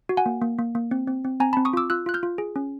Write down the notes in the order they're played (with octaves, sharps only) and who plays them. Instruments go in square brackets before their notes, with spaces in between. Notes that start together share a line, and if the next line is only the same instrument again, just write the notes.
[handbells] F#4
F#5 G#5
A#3
A#3
A#3
A#3
C4
C4
C4
C4 G#5 A#5
C4 A5 B5
C#6 D#6
F4 D6 E6
F4 E6 F#6
F4 F#6
F6 G6
F4
G#4
C#4